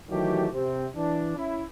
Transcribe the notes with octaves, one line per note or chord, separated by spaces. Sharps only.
D#3 E3 F#3 A3 F#4 G4
C3 C4
E3 D4
C#4 E4